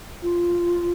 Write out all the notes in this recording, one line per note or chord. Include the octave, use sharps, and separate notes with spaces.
F4